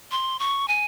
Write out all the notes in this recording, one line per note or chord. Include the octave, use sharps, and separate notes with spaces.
C6
C#6
G#5